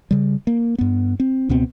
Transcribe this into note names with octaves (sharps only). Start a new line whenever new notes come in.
C#3 G3
A#3
G2 B3
C4
C#2 B2 B3 C4